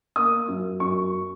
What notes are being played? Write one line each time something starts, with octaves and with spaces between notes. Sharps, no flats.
A#3 D#6
F#2
F#2 C#6